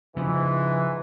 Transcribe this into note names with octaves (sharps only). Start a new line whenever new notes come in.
G#2 C#3 E3 F3